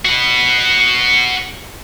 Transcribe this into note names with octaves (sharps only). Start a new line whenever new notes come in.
F#4 B4